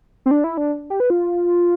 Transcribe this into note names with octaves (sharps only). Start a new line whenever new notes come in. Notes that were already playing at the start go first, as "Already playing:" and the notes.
C4
D4
E4
D4
G4
B4
F4